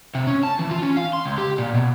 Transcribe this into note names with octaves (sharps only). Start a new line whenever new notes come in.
C3
C#4
A5
E3
F4
C#4
F5
C6
C#2
G4
A#2
B2